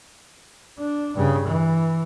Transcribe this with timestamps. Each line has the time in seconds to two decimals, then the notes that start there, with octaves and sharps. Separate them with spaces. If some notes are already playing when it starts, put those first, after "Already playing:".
0.78 D4
1.15 G2 C#3
1.47 E3